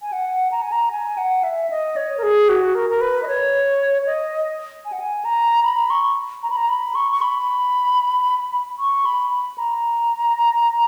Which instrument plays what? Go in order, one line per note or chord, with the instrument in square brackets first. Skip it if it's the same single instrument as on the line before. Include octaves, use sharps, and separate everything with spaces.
[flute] G#5
F#5
A#5
G#5
A#5
G#5
F#5
E5
D#5
C#5
A#4
G#4
F#4
A#4
A#4
B4
D#5
C#5
D#5
G#5
F#5
G#5
A#5
B5
C#6
A#5
B5
A#5
B5
C#6
C#6
B5
C#6
B5
B5
A#5